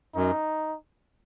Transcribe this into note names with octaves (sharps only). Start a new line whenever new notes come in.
F#2 D#4